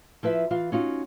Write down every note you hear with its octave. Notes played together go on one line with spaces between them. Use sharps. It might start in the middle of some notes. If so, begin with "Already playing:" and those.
F3 E4 B4 E5
E3 F4 F5
C#4 D#4 F4 F#4